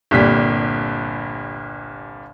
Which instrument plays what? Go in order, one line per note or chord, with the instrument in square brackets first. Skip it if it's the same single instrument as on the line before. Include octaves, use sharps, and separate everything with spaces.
[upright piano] G1 C2 A#2 G3 B6